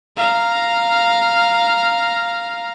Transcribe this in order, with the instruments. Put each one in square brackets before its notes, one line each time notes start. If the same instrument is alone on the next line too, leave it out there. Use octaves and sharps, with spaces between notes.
[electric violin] F5 A#5